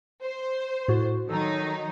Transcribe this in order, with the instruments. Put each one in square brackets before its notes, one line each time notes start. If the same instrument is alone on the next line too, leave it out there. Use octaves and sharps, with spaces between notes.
[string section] C5
[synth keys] A2 F#4
[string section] D#3 F#3 D#4 [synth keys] A4